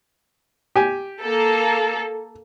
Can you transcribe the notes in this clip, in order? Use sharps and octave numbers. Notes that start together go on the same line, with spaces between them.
G4 G#5
A#3 A4